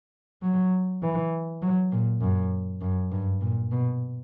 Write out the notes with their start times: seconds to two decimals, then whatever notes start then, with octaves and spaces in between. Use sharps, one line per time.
0.43 F#3
1.02 E3
1.62 F#3
1.92 A#2
2.21 F#2
2.81 F#2
3.12 G2
3.41 A#2
3.72 B2